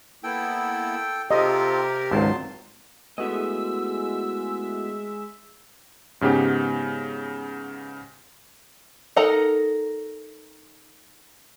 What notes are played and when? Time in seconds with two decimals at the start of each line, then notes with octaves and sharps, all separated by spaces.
0.24 A#3 B3 E4 A4 G5
1.31 C3 C4 F4 G4 A4 A#4 D#5
2.11 G#1 C#2 F#3 A5 C6
3.18 G#3 A3 B3 E4 F#4 D#5 E5 E6
6.21 G#2 C#3 B3 G4
9.16 D#4 A4 A#4 F#5 A#5